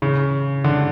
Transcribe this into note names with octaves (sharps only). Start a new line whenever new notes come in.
C#3
D3